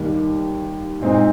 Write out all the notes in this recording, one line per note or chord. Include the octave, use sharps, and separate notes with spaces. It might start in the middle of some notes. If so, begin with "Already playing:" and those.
Already playing: D#2 D#3 G3 A#3
A#2 G#3 C4 D#4